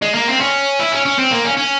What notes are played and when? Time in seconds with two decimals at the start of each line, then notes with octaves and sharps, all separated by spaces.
0.02 G#3
0.14 A#3
0.28 C4
0.40 C#4
0.79 E4
0.92 C#4
1.06 C#4
1.19 C4
1.32 A#3
1.45 C#4
1.57 C#4